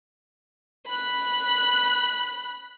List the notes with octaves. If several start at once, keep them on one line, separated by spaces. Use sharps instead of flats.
B5 F#6